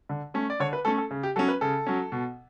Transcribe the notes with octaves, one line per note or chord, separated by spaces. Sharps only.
D3
A3 C#4
D5
D3 C#5
B4
A3 C#4 A4
A4
C#3
G4
F#3 C#4 A4
B4
C#3 A4
F#3 C#4
B2